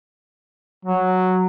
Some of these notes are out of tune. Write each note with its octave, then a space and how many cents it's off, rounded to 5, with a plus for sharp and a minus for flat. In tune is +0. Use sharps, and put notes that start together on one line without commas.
F#3 -5